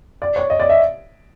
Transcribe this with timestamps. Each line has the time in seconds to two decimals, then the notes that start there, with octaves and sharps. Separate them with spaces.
0.22 D5
0.36 C#5
0.50 D#5
0.60 D5
0.70 E5